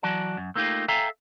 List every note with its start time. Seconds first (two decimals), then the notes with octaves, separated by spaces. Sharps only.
0.03 E3 F#3 F#4 D5 A5
0.37 F#2
0.56 A3 A#3 D#4 F4 G4
0.88 A4 E5 F5 G5 G#5 A#5